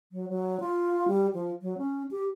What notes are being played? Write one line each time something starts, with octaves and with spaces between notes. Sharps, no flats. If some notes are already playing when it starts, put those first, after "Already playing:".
F#3
F#3
F4
G3
F3
F#3
C#4
G4